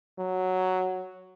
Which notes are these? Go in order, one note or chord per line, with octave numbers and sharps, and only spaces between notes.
F#3